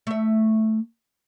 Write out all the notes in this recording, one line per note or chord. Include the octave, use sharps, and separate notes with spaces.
A3 E5